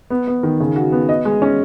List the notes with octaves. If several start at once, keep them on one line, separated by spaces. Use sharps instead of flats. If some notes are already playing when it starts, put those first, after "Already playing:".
B3
B3
D#3
C#3
F#4
B3
D#5
G#3
C#4